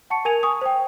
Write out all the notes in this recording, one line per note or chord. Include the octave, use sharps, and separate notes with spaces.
F#5 A5 C#6 C#7
A#4 G#5 G#6 D#7 F7
G#5 C#6 D#6
C5 G5